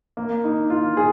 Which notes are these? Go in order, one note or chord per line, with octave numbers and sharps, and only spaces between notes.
A#3
D#4
F4
G#4